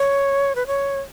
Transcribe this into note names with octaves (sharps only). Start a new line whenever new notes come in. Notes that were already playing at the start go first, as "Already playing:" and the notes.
Already playing: C#5
B4
C#5